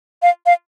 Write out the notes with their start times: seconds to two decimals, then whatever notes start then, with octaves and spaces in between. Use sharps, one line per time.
0.22 F5
0.46 F5